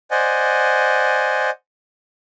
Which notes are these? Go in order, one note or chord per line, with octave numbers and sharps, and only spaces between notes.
C5 D5 D#5 F#5 G#5